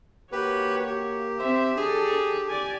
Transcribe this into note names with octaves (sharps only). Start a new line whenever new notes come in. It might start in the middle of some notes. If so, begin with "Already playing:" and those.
A#3 F#4 G4 B4 C#5
G4
C4 C5 E5
D4 G#4 A4
D5 G#5